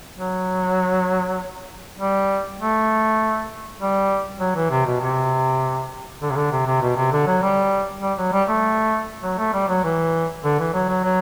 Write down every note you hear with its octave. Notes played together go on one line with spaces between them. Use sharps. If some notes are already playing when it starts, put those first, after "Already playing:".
F#3
G3
A3
G3
F#3
E3
C3
B2
C3
D3
C3
D3
C3
C3
B2
C3
D3
F#3
G3
G3
F#3
G3
A3
F#3
A3
G3
F#3
E3
D3
E3
F#3
F#3
F#3